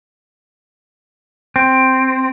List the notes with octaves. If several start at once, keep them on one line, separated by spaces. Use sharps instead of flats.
C4